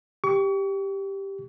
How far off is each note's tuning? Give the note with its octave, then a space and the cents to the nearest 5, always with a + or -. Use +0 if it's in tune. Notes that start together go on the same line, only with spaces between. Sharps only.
G4 +0 C#6 +40